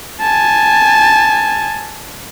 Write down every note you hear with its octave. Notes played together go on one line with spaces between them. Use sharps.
G#5 A5